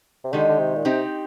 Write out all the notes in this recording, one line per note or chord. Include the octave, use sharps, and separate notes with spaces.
C3
D3 D#3 G#3 D#4 G4
D3
C3
A#2
C3 C4 D#4 G4